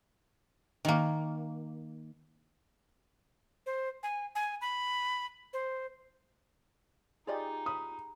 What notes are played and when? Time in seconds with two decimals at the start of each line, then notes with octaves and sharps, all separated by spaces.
0.85 D#3 A#3
3.66 C5
4.03 G#5
4.35 G#5
4.61 B5
5.53 C5
7.27 D#4 F4 G4 G#4 D5 D#5
7.66 B5 D#6